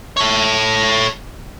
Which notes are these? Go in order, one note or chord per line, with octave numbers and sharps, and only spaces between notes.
A4 C#5